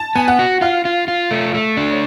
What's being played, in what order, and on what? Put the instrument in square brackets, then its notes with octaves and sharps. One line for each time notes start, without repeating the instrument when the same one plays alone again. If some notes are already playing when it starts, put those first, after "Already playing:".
Already playing: [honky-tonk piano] A5
[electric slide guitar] B3 [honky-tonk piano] G#5
[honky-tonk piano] F#5
[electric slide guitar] F#4
[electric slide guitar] F4 [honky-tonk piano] F5
[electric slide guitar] F4
F4
A3
A3
D4
[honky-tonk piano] C#5